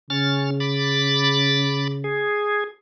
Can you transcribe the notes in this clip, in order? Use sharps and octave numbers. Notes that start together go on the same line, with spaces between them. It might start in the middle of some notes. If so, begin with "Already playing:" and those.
C#3 C#4 F6 A6
B5 D6 A6
G#4